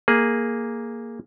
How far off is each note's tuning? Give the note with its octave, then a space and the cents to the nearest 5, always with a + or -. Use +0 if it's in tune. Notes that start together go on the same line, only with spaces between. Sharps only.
A#3 +0 G#4 +0